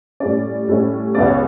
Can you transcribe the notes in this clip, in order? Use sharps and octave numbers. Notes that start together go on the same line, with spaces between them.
A2 G3 C#4 D5
A2 G3 C#4
C#2 C#3 G3 B3 D5
C#5